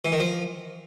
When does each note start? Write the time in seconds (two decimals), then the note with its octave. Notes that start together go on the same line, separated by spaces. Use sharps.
0.05 E3
0.12 D#3
0.20 F3